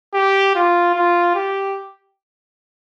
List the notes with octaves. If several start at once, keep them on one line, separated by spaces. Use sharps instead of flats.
G4
F4
F4
G4